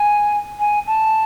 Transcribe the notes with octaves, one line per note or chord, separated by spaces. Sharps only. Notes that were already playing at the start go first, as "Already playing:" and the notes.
Already playing: G#5
G#5
A5